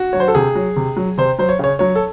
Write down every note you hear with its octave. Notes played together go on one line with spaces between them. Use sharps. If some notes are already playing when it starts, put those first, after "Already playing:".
Already playing: F#4
F#3 C#5
C5
A4
C3 G#4
F#3
C3
F#3
C3 C5
F#3 C5
C#5
C#3 C#5
F#3 C#5
A4